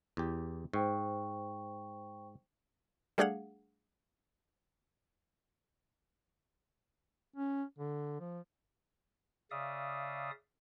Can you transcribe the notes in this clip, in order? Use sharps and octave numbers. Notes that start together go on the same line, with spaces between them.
E2 G4
G#2 C5 G5 C#6
G3 A3 D4 G#4 F5 F#5
C#4
D3
F3
C#3 D5 E5 F5 D#6